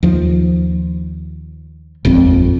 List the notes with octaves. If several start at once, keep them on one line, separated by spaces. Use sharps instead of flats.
D#2 F3
D#1 G#1 F2 C4